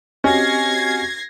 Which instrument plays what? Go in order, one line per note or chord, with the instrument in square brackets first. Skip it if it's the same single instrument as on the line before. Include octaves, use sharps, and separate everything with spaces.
[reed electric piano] C4 G4 D#5 [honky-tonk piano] C#4 F#4 [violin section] G#6 A#6 C7